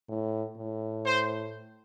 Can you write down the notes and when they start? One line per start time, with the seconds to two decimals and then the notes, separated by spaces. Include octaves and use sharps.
0.09 A2
0.57 A2
1.07 C5